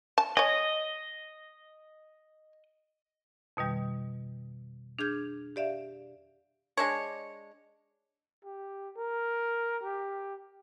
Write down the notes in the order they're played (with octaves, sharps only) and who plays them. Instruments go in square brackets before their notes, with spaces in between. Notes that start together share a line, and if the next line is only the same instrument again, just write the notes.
[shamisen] A5
[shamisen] C#5 G#5 [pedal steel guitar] D#5
[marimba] F2 B2 D#3 G3
D4 G#4 F6 G6 G#6
G4 D5 E5 F5
[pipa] G#3 D4 C#5
[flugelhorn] G4
A#4
G4